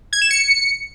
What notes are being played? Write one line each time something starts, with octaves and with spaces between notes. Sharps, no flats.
G#6
E7
C#7